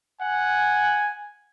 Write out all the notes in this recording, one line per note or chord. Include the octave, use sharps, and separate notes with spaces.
F#5 G#5